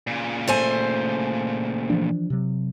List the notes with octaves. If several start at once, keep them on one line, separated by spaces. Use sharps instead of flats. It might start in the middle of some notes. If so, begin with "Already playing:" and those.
A#2 C#3
A3 C5 G#5
E3 F3 D4
C3 F#3